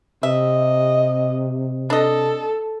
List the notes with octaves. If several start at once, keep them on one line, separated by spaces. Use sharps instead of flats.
C3 D#5 E5
D4 A4 D#5